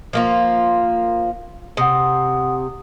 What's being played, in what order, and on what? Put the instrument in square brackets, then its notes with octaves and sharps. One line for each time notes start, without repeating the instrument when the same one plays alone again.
[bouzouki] F3 A#3 F4
[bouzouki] C3 [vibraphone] F#5 D#6